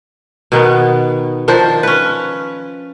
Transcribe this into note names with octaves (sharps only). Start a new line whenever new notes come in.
B2 D#3 B3
D#3 F3 D4 C5
C#4 B4